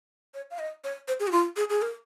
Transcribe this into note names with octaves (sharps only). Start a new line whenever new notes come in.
C#5
F5
D#5
C#5
C5
G#4
F#4
F4
G#4
G#4
A#4